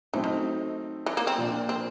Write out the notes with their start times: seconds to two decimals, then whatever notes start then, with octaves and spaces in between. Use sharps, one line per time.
0.14 E3 F#3 A3 C4 D#4
0.24 D#3
1.06 E3
1.17 A#3
1.27 C4
1.37 A#2 F3 A#3 D4 F4
1.69 C4